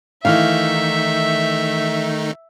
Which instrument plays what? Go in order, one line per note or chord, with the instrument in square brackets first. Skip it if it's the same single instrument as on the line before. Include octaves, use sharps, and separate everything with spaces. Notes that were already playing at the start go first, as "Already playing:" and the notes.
[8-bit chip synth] D#3 A3 D#4 [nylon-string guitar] E3 F5 [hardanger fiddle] E5